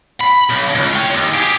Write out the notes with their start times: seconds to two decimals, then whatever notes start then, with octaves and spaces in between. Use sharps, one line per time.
0.21 B5
0.49 B1
0.75 C#2
0.94 C#5 G5
1.14 D#2
1.34 G4 G#4